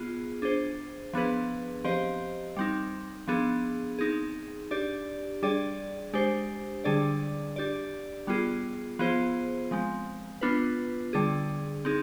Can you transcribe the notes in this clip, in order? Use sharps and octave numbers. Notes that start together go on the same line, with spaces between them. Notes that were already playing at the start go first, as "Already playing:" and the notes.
Already playing: B3 F4 G#4
D4 G#4 C5
F3 B3 D4 G#4 B4
F3 C4 G4 C5 D#5
G3 C4 D#4
F3 B3 D4 G#4
C4 D#4 G#4
D4 G4 D5
G3 D4 G#4 D5
G#3 D4 G4 C5
D3 G3 D4 G#4 D5
D4 G4 D5
G3 B3 F4 G#4
F3 B3 F4 G#4 C5
F3 G#3 C4
B3 D4 F4 B4
D3 G3 D4 G#4
C4 D#4 G#4